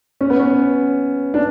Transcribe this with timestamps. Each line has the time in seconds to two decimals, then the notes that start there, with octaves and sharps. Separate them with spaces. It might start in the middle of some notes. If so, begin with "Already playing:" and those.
0.21 C#4
0.30 B3
0.39 C#4
1.34 D4